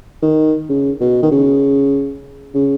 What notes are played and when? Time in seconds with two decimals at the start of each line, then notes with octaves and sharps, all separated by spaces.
0.23 D#3
0.69 C#3
1.00 B2
1.23 D#3
1.32 C#3
2.55 C#3